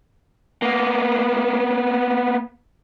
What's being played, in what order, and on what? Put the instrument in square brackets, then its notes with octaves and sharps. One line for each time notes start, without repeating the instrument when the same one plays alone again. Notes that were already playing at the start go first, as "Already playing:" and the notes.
[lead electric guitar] A#3 B3